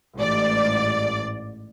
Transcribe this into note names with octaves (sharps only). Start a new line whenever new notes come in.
A1 G#2 D5